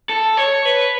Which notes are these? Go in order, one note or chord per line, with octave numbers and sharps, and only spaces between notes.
A4
C#5
B4